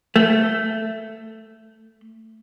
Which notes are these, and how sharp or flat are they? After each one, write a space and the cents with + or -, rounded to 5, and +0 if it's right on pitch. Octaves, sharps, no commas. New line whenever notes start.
A3 +10